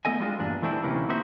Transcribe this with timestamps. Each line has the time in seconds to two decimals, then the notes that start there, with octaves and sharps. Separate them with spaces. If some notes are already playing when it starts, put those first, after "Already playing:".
0.05 A3 B3 A4 D#5 G#5
0.20 G3 G#3 D4 F4 F#4
0.38 E2 G2 A#2 D4
0.62 E3 A3 C4 D4 E4
0.83 D2 C3 E3 A#3 C#4 D#4
1.09 A#3 C4 D#4 F#4 C5 E5